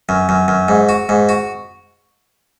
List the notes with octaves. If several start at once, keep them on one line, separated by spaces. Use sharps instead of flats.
F#2
F#2
F#2
G#2
F#4
G#2
F#4